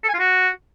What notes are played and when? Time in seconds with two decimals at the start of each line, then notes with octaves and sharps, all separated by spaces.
0.03 A4
0.09 G#5
0.14 F4
0.19 F#4